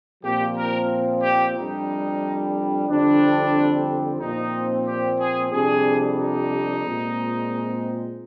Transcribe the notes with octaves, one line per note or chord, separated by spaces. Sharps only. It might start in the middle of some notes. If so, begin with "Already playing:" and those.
A#2 F3 C4 G4
A#4
G4
F2 C3 G3 D4 D#4
F2 D3 G3 C4 D4
A#2 F3 C4 D#4
G4
G#4
F2 C3 G3 D4 G#4
D#4
A#2 G#3 C4